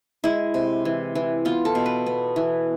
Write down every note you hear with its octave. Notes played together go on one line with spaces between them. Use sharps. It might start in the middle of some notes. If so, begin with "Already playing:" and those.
G#3 E4
C3
E3
E3
B3 F4
A4
B2
B4
B3
E3